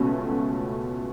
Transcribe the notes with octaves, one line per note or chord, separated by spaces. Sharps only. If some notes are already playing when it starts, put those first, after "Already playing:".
Already playing: C#2 B2 A3 C#4 F#4